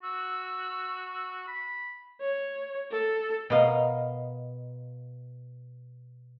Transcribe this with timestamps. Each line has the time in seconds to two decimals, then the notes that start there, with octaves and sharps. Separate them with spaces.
0.03 F#4 E6
1.48 B5
2.20 C#5
2.91 A4
3.50 B2 A#4 D#5 F5